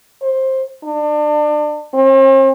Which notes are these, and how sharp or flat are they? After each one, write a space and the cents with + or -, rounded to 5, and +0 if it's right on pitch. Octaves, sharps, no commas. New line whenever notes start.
C5 +15
D4 +30
C4 +45